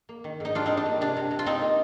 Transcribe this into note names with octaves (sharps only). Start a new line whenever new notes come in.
A#3
D#3
G#2 D#4
G3 D4 F4
G3 C4 D#4
D4
A#3
C3 D4
C3
C3
F4
C3 C4 D#4
A#3